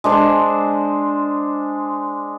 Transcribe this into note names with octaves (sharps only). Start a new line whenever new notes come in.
G#3 D4 C5